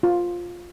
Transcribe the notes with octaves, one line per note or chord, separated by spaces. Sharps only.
F4